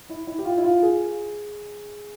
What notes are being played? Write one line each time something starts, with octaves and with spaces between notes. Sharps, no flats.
E4
E4
G4
F4
E4
F4
G#4